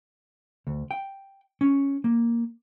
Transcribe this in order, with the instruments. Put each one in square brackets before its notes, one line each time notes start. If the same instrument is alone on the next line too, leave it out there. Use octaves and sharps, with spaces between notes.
[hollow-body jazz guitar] D2
G5
C#4
A#3